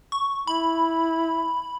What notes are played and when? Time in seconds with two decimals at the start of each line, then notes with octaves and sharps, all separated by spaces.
0.12 C#6
0.47 E4 B5